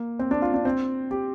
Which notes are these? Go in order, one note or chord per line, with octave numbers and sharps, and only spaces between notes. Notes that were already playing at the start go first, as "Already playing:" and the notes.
Already playing: A#3
C4
D4
F4
D4
C4
G4